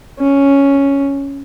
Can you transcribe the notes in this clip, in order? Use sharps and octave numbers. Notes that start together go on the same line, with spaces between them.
C#4